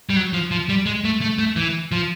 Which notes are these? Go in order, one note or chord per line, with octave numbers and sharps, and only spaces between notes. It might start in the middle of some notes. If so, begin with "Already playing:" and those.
G3
F#3
F3
F3
G3
G#3
A3
A3
A3
E3
F3